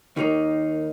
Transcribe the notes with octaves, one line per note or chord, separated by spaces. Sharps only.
D#2 D#3 G3 A#3 D#4